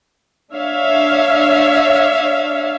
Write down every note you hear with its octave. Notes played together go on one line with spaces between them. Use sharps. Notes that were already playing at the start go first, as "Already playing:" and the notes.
D4 C#5 E5 F5